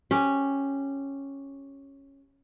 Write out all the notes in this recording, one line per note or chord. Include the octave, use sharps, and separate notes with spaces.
C#4 G4